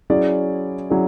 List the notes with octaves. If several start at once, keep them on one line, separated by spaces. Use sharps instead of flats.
F#3 C#4 E4 G#4 D5
F#3 C#4 E4 G#4 D5